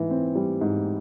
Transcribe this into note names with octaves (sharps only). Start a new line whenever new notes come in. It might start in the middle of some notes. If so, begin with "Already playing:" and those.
Already playing: G#2 E3
C4
G3
G#2